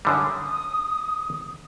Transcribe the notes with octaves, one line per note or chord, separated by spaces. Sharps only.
F#2 D3 G3 D#6